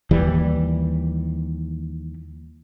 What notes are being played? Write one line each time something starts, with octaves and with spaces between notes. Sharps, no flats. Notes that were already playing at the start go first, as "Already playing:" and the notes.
D#2 E3 G3